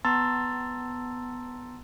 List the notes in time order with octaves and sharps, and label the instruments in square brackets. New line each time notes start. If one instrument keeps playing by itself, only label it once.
[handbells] B3 A5 A#5 C6 E6 A6